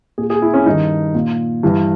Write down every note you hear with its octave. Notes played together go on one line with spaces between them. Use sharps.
A#2 G#4
G#4
E4
C#4
G2 D#3 D#4
A#2
G2 E3